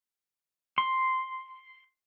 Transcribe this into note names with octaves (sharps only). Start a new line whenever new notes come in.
C6